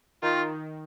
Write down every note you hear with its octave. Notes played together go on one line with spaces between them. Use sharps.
D#3 F4